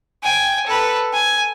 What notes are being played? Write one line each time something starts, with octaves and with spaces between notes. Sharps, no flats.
G5 G#5
A4 B4
G#5